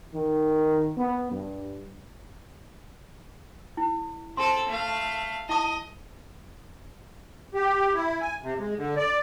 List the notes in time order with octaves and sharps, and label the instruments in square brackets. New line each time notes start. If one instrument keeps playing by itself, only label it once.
[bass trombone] D#3
B3
G2
[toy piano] E4
[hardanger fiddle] C4 A4 [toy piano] C6
[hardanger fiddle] A3 F5
[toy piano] E4 A5 D#6 [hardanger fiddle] D#5
[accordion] G4
E4
G#5
C3
G#3
D3
D5